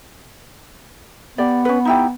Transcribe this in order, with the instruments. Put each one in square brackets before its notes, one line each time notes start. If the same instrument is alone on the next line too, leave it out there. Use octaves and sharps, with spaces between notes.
[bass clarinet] B3 [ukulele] G4 D5
[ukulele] C#4 B4
D#4 E4 G4